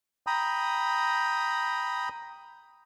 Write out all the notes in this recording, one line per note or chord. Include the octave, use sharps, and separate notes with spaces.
G5 A#5 B5 D#6